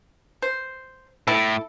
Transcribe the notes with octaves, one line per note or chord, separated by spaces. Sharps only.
C5
A2 E4 A4